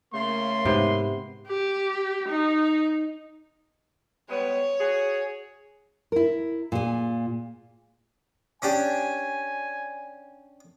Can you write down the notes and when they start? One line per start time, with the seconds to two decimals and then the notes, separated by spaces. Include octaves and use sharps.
0.13 C#3 A3 A#3 C6
0.65 G#2 C3 B3
1.47 G4
2.28 D#4
4.29 G3 G#3 B3 C#5
4.80 F#4 G#4
6.12 E4 A#4
6.72 A#2 G#4
8.62 C#4 D4 G4 G#5